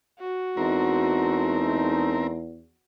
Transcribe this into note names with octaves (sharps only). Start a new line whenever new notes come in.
F#4
E2 G#3 A3 C4 D#4 A#4